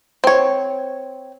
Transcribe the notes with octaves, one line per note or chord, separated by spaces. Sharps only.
C4 C#5